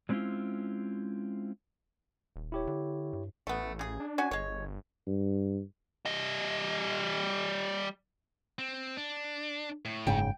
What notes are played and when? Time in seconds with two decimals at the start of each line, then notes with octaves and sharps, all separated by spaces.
0.09 F#3 G#3 C4 C#4 E4 F4
2.36 D#1
2.52 E4 G4 C#5
2.67 D3
3.13 G2
3.47 A1 A3 B3
3.79 C#3 G#4
4.00 D4
4.18 C#4 F#4 G#5
4.31 G1 G#3 C#5
5.07 G2
6.05 G3 D#5
8.59 C4
8.97 D4
9.85 A2
10.07 F#1 G#2 C#3 G5